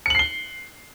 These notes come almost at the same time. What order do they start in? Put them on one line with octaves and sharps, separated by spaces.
C#7 F#7 C7 G7